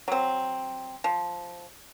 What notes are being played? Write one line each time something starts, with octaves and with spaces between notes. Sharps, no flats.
F#3 C4
F3